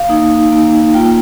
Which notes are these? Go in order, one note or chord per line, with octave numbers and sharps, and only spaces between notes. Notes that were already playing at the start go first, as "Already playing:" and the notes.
Already playing: F5
A#3 D#4
A#3 D#4
A#3 F4 G5